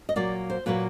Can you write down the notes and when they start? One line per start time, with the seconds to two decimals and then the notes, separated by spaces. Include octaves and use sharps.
0.09 D#5
0.16 A#2 F#3 A#3 D5
0.50 C5
0.66 A#2 F#3 A#3 B4